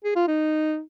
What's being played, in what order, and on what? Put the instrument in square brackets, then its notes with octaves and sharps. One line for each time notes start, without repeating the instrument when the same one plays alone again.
[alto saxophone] G#4
F4
D#4